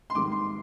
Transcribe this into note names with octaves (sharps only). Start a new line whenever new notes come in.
C6
G#2 D#3 G3 D6
C6